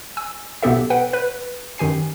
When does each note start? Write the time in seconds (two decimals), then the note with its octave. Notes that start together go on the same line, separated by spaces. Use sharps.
0.17 G#5 E6
0.63 B1 B2 B3 G4 A4 E5
0.90 B4 F#5 G5
1.13 B4
1.78 F#2 D#3 G4 G#5 C7